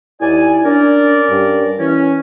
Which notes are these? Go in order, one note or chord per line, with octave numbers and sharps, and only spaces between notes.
D#2 E4 D5 G#5
C#4 D4 A#4 D5
G2
E3 C#4